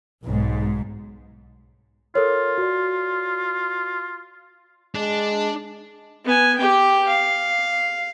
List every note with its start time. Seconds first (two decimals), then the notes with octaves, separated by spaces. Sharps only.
0.23 B1 G#2
2.15 F4 A4 A#4 C#5
2.58 F#4 D5
4.95 G#3 D4
6.25 B3 G#5
6.58 G4 G5
7.07 F5